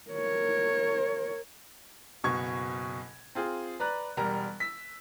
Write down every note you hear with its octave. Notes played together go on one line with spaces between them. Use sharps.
A#4 C#5
F#1 B2 C#6 G#6
C4 F4 G#4
B4 D5 A#5 F#6
E1 G3 A#4 A#5
E6 B6